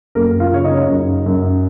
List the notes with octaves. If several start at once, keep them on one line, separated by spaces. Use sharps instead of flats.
F#2 A#3 A#4
F4 F5
C#3 C#5
D#4 D#5
F#2
F#2